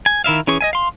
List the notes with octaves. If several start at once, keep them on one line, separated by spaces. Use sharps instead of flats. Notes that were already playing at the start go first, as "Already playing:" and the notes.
G#5
D#3 E4 E5 F5
E3 C#4 G#4 C#6
D#5 E5 G#5
F5 C6